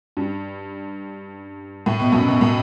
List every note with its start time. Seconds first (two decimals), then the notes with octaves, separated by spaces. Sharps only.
0.17 G2
1.86 A2
2.00 B2
2.12 F#2 A2
2.28 B2
2.41 A2